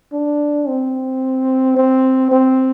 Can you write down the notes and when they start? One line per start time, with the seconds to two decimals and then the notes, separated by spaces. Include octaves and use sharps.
0.12 D4
0.68 C4
1.76 C4
2.31 C4